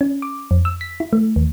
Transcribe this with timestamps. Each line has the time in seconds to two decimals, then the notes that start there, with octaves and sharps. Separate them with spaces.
0.01 C#4
0.22 D6
0.51 F2
0.65 E6
0.81 B6
1.00 E4
1.13 A3
1.36 D#2